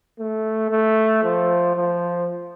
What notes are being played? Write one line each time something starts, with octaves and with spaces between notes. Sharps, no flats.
A3
A3
F3
F3